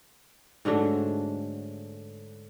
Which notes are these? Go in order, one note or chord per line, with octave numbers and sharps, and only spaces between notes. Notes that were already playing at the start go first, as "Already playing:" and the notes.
G#2 D3 F#3 A3